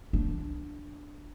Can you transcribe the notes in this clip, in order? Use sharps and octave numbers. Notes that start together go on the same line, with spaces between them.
D4